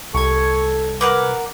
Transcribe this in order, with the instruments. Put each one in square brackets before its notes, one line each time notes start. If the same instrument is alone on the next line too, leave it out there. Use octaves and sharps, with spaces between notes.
[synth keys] C2 G#6 [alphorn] A4 [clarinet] C#6
[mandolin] A#4 F#5 D6 [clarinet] B4